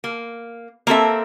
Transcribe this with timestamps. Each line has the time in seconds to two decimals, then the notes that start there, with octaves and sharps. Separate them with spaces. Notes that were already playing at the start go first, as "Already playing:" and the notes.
0.04 A#3
0.87 A#3 C4 A4 E5